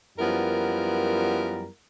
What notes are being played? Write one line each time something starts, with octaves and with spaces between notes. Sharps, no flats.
F#2 F3 G3 B3 E4 A#4